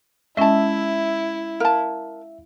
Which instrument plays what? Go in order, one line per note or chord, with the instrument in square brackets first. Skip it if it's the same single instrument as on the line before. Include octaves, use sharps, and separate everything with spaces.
[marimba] G#3 C#4 [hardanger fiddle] E4 [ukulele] D#5 A5 [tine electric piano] E5
[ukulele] A#4 A5 [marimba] F5